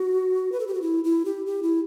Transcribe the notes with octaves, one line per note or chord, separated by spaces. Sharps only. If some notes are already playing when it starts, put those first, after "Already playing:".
Already playing: F#4
B4
A4
G4
F#4
E4
E4
G4
G4
E4